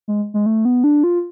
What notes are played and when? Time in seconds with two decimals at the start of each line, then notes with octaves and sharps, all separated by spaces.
0.08 G#3
0.34 G#3
0.46 A3
0.65 B3
0.84 D4
1.04 F4